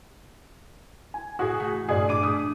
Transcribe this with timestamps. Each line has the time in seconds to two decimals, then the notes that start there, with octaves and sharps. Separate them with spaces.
1.14 G#5
1.39 A2 E4 F#4 G#4
1.60 A3
1.89 G2 A#2 G#4 D5 G#5
2.09 D4 D6 D#7
2.23 A3 D#6